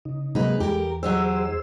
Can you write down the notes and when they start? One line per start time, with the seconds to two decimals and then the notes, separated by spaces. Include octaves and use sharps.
0.05 C#3 D#4
0.35 C3 F#3 G#3 A#3 D#4 G#4 B4
0.60 E2 G4 A#4
1.03 F#3 D#4 G4 G#4 C5 E6